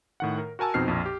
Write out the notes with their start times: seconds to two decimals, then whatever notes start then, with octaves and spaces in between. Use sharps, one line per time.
0.20 A2 D#3 F#5
0.38 A#4
0.59 F#4 A#4 G#5 A5 E6
0.74 F2 B2 C4 D#4 F6 C7
0.88 A#1 F2
1.06 G4